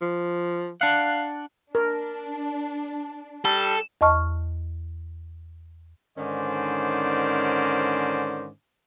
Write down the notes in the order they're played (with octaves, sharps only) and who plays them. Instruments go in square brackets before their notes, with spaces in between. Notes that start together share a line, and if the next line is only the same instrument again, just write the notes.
[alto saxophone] F3
[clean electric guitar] D4 F#5 [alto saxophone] F5
[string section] D4 [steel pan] A#4
[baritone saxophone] G3 [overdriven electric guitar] A4
[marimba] E2 D#5 A5 C#6 F6
[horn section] G#2 D3 D#3 C#4 C5 D5